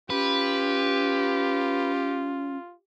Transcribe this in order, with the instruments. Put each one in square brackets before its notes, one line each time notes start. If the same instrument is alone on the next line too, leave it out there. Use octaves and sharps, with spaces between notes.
[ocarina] C#4 [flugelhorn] F4 [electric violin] G4 [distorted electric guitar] B4